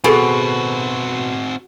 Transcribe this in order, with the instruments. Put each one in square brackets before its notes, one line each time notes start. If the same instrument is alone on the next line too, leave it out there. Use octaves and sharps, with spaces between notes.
[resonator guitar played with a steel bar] B2 [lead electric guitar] C4 F#4 [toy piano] G#4 A4 G#5